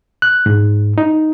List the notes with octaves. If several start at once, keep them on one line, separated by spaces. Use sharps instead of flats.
F#6
G#2
D#4